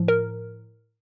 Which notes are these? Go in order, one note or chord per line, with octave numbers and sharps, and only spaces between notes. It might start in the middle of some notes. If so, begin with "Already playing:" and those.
Already playing: A2 F3
A#4